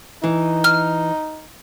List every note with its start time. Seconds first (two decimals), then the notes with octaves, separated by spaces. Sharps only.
0.24 E3 D#4
0.64 F6